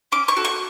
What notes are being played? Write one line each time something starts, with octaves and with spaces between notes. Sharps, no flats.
C#4 D6
C#6
F#4 A4
C#6